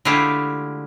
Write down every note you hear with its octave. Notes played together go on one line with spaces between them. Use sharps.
D3 G#3 A3 E4 F4 G4